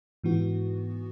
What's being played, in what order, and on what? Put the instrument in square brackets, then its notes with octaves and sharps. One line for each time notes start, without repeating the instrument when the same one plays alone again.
[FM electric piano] G#2 E3 B3 F#4